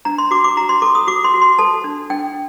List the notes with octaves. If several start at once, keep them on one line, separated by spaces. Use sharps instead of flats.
D4 A#5
C6
F#4 D6
D6
F#4 A#5
C6
A4 D6
D#6
F#4 D6
C6
F#4
C6
A4 A5
D4
D4 G5